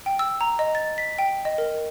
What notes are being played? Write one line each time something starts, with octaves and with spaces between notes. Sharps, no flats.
G5
E6
A#5
D#5
A6
B6
G5
D#5
A#4